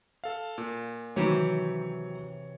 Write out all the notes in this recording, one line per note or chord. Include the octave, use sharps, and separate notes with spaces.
A4 F5
A#2
C3 D#3 E3 F#3 G4 C#5